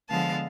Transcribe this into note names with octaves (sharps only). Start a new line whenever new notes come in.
D3 F3 G#3 B3 F5 A5